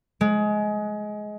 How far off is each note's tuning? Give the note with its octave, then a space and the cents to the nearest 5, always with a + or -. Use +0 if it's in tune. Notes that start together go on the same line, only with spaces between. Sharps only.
G#3 +20